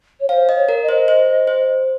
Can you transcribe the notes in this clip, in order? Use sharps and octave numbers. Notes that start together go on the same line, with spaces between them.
C#5
C5 F5
D#5
C#5
A#4
D#5
C5
C5
C5